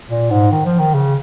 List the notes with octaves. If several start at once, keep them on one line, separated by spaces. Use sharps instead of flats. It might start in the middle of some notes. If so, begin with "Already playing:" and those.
A#2
G#2
D#3
F3
D#3
C#3